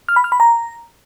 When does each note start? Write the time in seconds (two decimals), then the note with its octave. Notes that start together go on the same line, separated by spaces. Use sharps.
0.09 F6
0.16 B5
0.24 F6
0.32 B5
0.40 A#5